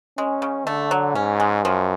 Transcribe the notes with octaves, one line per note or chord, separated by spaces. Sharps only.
G#3 C#4
C#3
D3 A3
F#3
G#2 C#4
G#3
F#2 F3